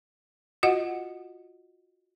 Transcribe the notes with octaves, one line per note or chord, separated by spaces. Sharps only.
F4 F#4 D#5 F#5